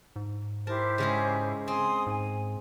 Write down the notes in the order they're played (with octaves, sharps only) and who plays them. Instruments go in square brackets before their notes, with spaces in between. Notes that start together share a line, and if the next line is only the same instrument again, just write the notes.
[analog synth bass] G#2
[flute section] E4 G4 C5 [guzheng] A#4 A5
[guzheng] C#3 G#3 G#4
[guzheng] C4 [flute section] G#5 C6 D#6
[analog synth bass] G#2 [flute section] G#5